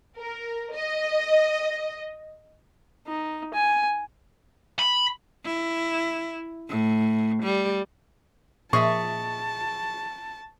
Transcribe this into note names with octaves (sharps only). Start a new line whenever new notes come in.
A#4
D#5
D#4
G#5
B5
E4
A2
G3
A#2 F3 G#4 D#5 E5 A5 C#6